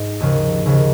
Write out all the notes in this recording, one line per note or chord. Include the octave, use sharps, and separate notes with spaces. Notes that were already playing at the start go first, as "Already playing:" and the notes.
Already playing: G#2
D#2 C#3 F3
D#2 C#3 F3